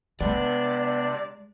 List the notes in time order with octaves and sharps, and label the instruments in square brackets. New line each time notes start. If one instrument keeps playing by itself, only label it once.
[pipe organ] C3 D4 [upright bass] G#3 [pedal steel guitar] B3 [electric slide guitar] D5